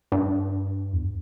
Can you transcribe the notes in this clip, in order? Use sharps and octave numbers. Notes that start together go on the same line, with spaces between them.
G2
E2